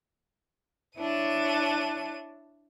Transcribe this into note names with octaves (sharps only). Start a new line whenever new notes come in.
D4 E4 C#5 D#7